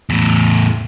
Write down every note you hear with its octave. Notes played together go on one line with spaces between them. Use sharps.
E2 A2